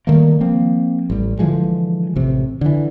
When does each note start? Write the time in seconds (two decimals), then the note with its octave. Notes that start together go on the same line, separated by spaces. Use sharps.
0.07 D#3 G3 A3 A#3
0.41 F3 A#3 C4
1.10 A1 G3
1.39 D3 E3 F3 G#3
2.16 A1 C3
2.61 D3 E3